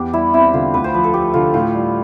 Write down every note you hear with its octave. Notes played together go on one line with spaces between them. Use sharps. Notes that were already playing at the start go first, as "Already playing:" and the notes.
Already playing: E2 D4 G4
G3 E4
C4 E4
D3 F4
D2 B4
C5
F3 B4
A4
A3 G4
D3 F4
A2 F4
G3